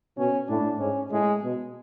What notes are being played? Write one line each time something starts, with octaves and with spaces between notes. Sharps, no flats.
B2 C#4
A2 D4
G#2 C#4
A2 G#3
B2